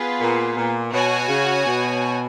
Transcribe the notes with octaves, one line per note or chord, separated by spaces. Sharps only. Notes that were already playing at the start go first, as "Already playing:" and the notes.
Already playing: B3 F4 G#4 B4
A#2
A#2
B2 F#4 C#5 G#5
C#3
B2